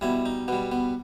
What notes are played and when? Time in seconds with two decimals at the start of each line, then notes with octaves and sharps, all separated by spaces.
0.01 B2 G3 E4
0.26 D#4
0.48 B2 G3 B3
0.72 B3